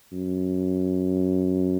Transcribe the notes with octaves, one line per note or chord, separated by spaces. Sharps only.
F#2